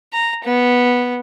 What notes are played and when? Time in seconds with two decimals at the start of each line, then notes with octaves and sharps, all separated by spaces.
0.13 A#5
0.44 B3